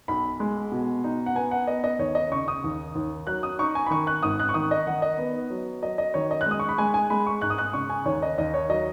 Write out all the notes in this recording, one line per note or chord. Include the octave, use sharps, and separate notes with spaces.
B1 B5
G#3
B2
D#4
F#5
B3 G#5
F#5
B3 D#5
D#5
D#2 C#5
D#5
C#3 C#6
D#6
D#2
D#2
F#3 F#6
D#6
D#4 C#6
G#5
B5
D#3 C#6
F#6
G#1 D#6
F#6
C#6
D#3 D#6
D#5
D#3 F#5
D#5
B3
F#3
F#3 D#5
D#5
D#3 C#5
D#5
F#6
G#3 D#6
C#6
B5
G#3 G#5
G#5
G#3 B5
C#6
G#2 F#6
D#6
F#6
C#3 C#6
G#5
D#2 C#5
D#5
D#2 D#5
C#5
F#3 D#5